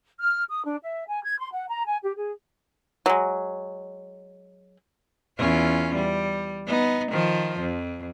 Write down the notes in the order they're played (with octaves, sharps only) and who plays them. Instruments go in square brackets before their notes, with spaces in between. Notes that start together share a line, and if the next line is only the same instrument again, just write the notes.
[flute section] F6
D#6
D4
E5
G#5
G#6
C6
F#5
A#5
G#5
G4
G#4
[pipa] F#3 G#3
[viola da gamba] E2 C#4 F4
G3
B3 D#4
D#3 F3
F2